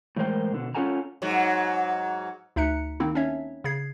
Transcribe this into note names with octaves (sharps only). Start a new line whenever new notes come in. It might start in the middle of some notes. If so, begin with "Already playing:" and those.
A2 E3 G#3 A#4 C5 G5
B2 D3
C#4 F4 A4 F#5 G#5 A#5
G#2 F#3
D2 D#4 E5 A#5 F#6 C#7
D#3 A#3 C4 D#4 E4
C#4 D4 C#5 E5
C#3 G#4 G#6 C7